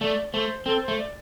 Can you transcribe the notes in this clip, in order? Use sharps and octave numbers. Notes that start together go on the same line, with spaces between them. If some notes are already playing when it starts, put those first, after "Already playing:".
A3 D5
A3 C5
C4 A4
C5
A3
D5